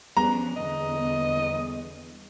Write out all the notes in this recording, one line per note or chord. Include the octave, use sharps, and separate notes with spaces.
F3 G3 B3 C#4 D4 G#4 A#5
E2 D3 D#5